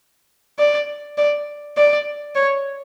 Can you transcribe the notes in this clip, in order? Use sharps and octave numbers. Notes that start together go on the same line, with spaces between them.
D5
D5
D5
C#5